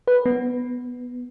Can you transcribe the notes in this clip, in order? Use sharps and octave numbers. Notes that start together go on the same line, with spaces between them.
B4
B3